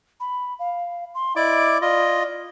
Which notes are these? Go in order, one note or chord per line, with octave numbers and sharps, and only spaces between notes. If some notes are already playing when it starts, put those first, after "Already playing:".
B5
F5
C6
E4 D5 D#5 D6
F4 D5 D#5